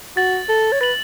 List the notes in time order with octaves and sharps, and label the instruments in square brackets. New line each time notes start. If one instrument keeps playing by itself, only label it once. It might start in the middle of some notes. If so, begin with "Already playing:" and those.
[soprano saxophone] F#4 [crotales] A6 F#7
[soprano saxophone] A4
C#5
[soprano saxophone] B4 [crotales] A6 F#7